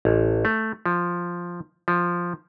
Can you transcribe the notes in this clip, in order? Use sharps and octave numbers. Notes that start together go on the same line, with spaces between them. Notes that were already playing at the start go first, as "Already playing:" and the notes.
A1
A3
F3
F3